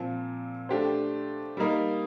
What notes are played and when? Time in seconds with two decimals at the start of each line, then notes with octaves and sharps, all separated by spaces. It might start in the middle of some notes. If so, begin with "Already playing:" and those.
Already playing: A#2 F3 C4
0.69 A3 D4 G4 C5
1.57 G3 A#3 D#4 A#4